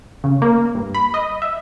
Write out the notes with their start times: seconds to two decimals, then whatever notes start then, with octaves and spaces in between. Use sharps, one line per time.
0.24 C#3
0.42 A#3
0.75 G2
0.94 B5
1.14 D#5
1.42 E5